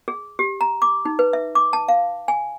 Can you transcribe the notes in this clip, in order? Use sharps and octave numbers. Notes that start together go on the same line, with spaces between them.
G#4
G4
A#5
D6
D#4
B4
E5
D6
A5
F5
G#5